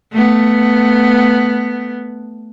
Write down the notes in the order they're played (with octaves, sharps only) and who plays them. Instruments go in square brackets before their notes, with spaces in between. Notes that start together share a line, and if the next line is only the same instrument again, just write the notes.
[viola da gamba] A3 B3